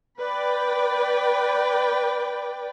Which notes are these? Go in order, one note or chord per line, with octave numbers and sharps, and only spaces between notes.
B4 D5 G5